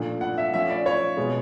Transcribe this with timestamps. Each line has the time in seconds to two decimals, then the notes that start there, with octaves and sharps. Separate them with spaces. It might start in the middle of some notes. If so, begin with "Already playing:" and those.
Already playing: A#2 F3 A3 D4
0.21 F#5
0.38 E5
0.54 F3 A3 C#4 E5
0.70 D5
0.86 C#5
1.17 B2 G#3 B3